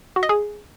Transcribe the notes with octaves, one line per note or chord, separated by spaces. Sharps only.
F#4
D#5
G#4